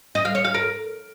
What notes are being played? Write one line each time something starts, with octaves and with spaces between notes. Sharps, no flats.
D#5
F5
C#5
F5
A#4